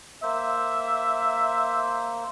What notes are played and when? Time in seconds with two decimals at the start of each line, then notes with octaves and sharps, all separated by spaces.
0.23 A#3 C5 E5